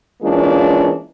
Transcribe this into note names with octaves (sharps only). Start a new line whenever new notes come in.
E3 G#3 A#3 C#4 D4 F4